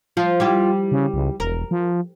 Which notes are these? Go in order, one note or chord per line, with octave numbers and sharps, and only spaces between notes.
F3 F4
G3 E4 G4
C#3
C#2
E1 A#4
F3